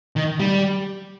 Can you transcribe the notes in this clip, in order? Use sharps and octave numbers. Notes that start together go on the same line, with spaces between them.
D#3
G3